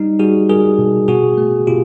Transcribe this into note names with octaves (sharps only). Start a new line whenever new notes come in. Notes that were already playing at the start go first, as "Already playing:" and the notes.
Already playing: G3 D#4
G3 F#4 G#4
G3 G#4 A#4
B2
B2 F#4 G#4
A3
B2 F4 G4